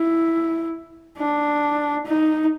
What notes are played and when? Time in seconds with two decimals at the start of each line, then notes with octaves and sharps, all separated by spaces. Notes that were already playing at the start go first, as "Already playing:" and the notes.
Already playing: E4
1.18 D4
2.06 D#4